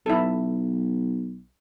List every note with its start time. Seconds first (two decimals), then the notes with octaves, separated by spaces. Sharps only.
0.06 B1 E4 A4